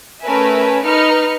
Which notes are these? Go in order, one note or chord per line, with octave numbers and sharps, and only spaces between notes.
A3 C#4 A#4 B4 E5 G#5
D#4 B4 F6 C#7